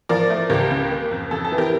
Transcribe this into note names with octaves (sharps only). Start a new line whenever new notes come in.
F3 A#4 D5
A3
C#2 G4 A#4
C#3
A#3
F2
F2 A4
A4
E3
G4 A#4